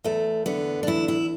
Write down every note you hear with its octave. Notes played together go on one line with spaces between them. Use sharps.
E2 A3
D3 B3
D4
E2 E4
E4